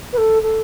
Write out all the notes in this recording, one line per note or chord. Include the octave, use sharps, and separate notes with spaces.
B4
A4
A4